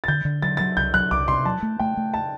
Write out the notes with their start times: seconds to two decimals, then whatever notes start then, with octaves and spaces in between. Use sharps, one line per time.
0.04 A6
0.08 D3 G6
0.25 D3
0.42 F#3 A6
0.57 F#3 A6
0.77 C2 G6
0.94 F#3 F#6
1.11 C2 D6
1.28 C3 C6
1.45 F#3 A5
1.63 A3
1.79 A3 G5
1.97 A3
2.14 A5